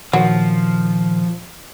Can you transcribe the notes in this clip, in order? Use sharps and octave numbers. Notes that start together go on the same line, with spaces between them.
A#2 D#3 F3 F#3